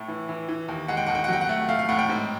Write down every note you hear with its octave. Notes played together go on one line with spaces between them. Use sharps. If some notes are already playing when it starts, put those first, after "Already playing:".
Already playing: A2 A3
E3
E3
E3
D#2
G#3 F#5
G5
D#2 F#5
G5
F#5
F#3 G5
F#5
A3
A3 F5
F5
A2 F#5
G5
G#2